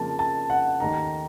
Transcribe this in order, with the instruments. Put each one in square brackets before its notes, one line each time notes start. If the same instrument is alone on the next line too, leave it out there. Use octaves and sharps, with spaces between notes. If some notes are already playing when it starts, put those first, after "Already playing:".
Already playing: [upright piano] F2 C#3 F3 A#3 [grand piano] A5
[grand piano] A5
F#5
[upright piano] D#2 D#3 A3 D#4 [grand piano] A#5